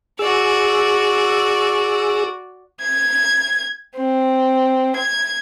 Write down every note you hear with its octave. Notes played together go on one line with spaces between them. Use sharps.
F#4 G#4 D5 E6
G#6
C4
G#6